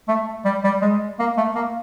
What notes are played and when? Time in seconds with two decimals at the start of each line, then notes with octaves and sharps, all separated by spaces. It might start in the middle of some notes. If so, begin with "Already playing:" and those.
0.08 A3
0.45 G3
0.64 G3
0.82 G#3
1.19 A#3
1.37 A3
1.56 A#3